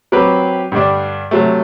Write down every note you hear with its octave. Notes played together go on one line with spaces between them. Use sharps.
F#3 C4 G4 B4
G2 D3 G3 D4
C3 F#3 A3